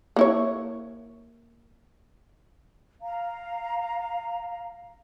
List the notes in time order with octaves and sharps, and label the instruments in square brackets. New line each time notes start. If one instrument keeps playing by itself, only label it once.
[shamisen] A#3 E4 C#5
[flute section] F5 A#5